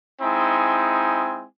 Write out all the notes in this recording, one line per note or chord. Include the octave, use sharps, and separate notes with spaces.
G#3 C4 D#4 E4 G#5